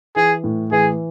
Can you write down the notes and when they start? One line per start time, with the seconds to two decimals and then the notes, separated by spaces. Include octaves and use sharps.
0.16 E3 G#4
0.44 A2
0.72 E3 G#4